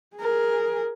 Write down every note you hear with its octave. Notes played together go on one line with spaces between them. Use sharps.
G#4 A#4